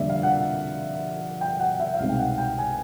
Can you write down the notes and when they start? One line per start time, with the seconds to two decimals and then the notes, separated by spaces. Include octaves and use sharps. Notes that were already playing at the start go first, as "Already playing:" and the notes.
Already playing: F2 D3 G3 A#3 D5 E5
0.10 F5
0.23 F#5
1.41 G5
1.60 F#5
1.80 E5
1.94 E5
1.99 C2 B2 G#3 C4 D#4 F5
2.09 G5
2.19 F#5
2.38 G5
2.58 G#5